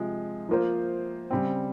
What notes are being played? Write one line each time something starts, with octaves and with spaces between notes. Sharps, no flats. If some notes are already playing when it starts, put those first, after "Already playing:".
Already playing: C3 F3 G#3
F3 A#3 F4 C5
C#3 G3 C4